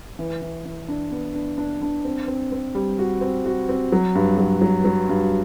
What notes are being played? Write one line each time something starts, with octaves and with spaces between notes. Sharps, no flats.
E3
E3
E3
D4
B3
D4
D4
D4
C4
C4
C4
G3
F#4
C4
F#4
C4
F#3
G2
F#3
F#3
F#3
G2